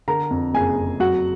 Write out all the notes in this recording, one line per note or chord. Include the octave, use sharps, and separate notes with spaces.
D3 A#4 A#5
F2
F#1 G#4 G#5
F2
F#3 F#4 F#5